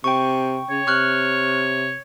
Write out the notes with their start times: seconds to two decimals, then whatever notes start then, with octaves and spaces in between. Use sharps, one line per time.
0.04 C3 G5 C#6
0.70 C#3 C#5
0.87 C3 C#6 F6 F#6